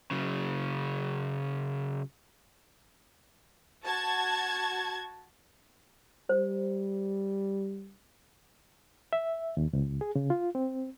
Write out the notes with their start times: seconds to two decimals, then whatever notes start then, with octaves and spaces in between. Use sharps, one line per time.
0.11 C#3 F#3
3.84 F#4 A5 G#6
6.29 G3 C5
9.13 E5
9.57 D#2
9.73 C#2
10.01 G#4
10.15 C#3
10.30 F4
10.55 C4